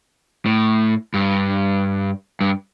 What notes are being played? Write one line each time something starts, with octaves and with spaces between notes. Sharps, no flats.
A2
G2
G2